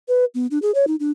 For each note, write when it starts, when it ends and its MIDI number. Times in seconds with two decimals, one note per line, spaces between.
0.08 0.25 71
0.35 0.47 59
0.51 0.59 62
0.62 0.71 68
0.74 0.85 73
0.87 0.96 63
1.00 1.11 62